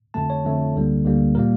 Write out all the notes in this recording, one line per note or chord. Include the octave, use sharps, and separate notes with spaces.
F2 D3 A3 A5
C#5
F2 D3 A3
D2 D3 G3 A#3
D2 D3 G3 A#3
A#2 G3 A#3 A#4